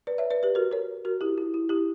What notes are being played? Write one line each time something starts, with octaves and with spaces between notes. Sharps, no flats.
B4 D5
C#5 E5
B4 D5
G4 B4
F#4 A#4
A#4 C#5
F#4 A#4
E4 G4
E4
E4
E4 G4